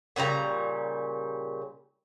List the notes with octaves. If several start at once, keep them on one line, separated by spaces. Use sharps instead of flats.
A#2 C#3 G3 A#5